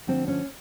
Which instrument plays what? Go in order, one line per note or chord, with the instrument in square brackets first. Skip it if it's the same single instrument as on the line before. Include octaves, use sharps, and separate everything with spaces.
[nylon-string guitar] D3 F3 A3 C4
C#4